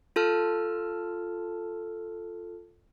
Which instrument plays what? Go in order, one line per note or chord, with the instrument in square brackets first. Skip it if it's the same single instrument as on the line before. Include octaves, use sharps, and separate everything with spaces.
[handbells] F4 A4 A5 F6